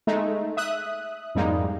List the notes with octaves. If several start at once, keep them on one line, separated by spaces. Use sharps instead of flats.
G#3 A3 D#4
E5 D#6 F#6
F2 G#2 G3 G#3 A#3 D#4